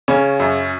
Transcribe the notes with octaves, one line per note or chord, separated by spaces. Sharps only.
C#3 C#4
F#2